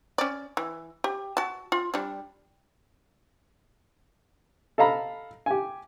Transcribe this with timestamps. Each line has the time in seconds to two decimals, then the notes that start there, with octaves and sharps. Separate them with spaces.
0.18 C#4 D5
0.57 E3
1.04 G4
1.37 F#4 A5
1.72 F4
1.94 G3 D4
4.78 A4 D#5 F5 A#5 B5
5.46 G4 G#5